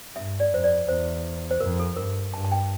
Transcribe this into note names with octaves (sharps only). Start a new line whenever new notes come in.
G2 E5
D5
F2 C5
D5
E2 C5
C5
F2 A#4
A4
G2 A#4
G2 A5
A5
G5